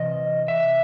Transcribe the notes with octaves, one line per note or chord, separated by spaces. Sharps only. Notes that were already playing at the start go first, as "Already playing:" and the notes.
Already playing: C3 E3 D#5
E5